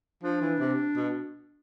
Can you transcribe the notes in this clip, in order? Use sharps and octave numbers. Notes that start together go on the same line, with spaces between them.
F3 D4
E3
C3
B2